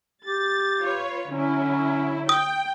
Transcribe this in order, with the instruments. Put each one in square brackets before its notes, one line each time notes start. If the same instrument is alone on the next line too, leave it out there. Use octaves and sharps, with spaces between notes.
[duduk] G4 [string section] A6
[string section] F4 B4 C#5
[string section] D3 F#3 E4 [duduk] C#4
[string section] G5 [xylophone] D#6